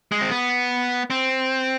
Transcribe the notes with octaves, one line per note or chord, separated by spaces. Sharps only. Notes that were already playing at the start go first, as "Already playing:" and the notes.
G#3
C4
B3
C4